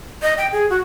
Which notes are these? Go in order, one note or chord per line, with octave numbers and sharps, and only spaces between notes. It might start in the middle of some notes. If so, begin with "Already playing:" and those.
D#5
G5
G#4
F#4